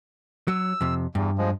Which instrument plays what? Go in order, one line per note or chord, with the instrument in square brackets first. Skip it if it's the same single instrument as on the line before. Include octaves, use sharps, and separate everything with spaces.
[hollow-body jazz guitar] F#3 [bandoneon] E6
[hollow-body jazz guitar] F2 C3
[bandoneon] E2 [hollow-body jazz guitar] G2
[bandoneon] F3 G#3